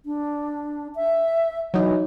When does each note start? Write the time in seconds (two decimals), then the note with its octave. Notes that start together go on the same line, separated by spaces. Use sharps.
0.06 D4
0.95 E5
1.74 E3 F#3 D#4